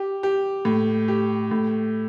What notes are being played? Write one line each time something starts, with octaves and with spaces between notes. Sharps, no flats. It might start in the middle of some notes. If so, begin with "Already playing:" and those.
Already playing: G4
G4
A2
G4
A2